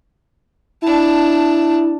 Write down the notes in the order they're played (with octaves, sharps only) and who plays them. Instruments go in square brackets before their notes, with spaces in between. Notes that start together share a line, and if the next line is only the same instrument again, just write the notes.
[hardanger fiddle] D4 A5 [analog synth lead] E4